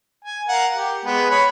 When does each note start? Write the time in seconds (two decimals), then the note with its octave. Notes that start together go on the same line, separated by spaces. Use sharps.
0.24 G#5
0.48 A#4 F5 F#5
0.75 G4
1.05 G#3 B3
1.30 C#5 B5